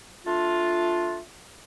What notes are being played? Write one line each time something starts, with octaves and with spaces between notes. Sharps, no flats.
A3 D4 F4